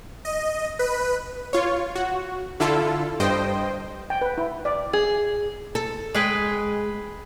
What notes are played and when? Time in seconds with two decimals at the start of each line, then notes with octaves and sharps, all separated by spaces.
0.25 D#5
0.79 B4
1.53 F4 C#5
1.96 F#4
2.60 D3 E4 F4 A4
3.20 G2 C5 D#5 G5
4.10 G5
4.22 B4
4.38 E4
4.65 D5
4.93 G#4
5.75 A4
6.15 G#3 G#4 B4 G5